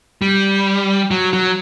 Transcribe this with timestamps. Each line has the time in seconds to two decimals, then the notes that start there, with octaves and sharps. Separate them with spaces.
0.22 G3
1.11 F#3
1.33 F#3